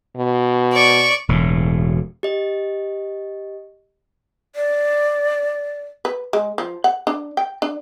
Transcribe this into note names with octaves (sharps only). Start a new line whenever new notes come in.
B2
D5 C#6
E1 A2
G4 D#5
D5
B4
G#3
F3
F#5
D4
G5
D4